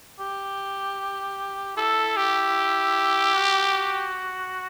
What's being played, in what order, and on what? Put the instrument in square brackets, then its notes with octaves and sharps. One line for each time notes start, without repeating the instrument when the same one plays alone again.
[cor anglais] G4
[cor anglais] E4 [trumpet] A4
[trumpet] G4
[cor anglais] F#4